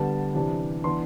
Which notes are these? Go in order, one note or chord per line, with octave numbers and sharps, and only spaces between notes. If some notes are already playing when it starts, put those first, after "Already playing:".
Already playing: D3 G3 B3 A5
C3 E3 G3 D4
E3 B3 D4 C6